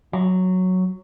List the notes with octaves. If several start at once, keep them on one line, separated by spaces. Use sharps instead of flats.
F#3